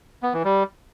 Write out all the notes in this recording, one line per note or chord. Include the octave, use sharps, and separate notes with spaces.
B3
E3
G3